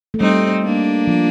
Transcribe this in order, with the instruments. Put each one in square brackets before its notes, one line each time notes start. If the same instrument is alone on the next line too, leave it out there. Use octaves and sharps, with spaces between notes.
[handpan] A3
[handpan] G3 [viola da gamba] C4 D#4
[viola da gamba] A#3 D4
[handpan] F3